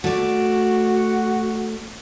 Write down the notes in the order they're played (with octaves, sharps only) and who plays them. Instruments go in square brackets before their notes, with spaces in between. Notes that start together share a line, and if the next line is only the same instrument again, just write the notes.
[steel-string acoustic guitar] A3 D5 [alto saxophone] F#4